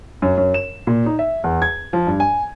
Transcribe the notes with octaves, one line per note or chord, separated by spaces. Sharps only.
F#2
F#2
E7
A#2
D#4
E5
E2
G#6
F3
G2
G#5